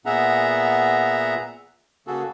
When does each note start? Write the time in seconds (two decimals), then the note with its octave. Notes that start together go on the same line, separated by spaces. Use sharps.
0.06 A#2 B3 G#4 E5 F#5 A#5
2.07 C#3 A#3 F#4 G#4 A4